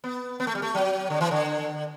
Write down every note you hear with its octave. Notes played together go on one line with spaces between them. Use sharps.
B3
B3
A3
G3
A3
F#3
D3
E3
D3